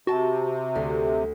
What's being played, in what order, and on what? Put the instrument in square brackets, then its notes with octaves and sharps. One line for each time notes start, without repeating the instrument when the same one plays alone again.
[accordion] C3 [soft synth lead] F#4 [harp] G5 A5
[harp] D2